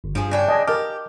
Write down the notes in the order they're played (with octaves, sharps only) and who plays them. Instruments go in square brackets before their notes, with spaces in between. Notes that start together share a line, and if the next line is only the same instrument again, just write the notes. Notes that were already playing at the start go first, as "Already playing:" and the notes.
[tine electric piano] G1
[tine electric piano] G2 [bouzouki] F3 G#4
[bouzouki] C#3 D4 G5
[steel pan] D#5 G#5 [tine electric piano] A5
[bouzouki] G4 [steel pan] A#4 D#5 A5 [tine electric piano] D6 F6